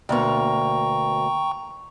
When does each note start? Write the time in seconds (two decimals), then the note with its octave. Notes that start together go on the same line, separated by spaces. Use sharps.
0.09 D2 B2 A#3 G5 A#5 C#6